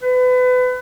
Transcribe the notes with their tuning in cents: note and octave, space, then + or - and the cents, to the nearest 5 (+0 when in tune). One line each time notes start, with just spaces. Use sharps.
B4 +30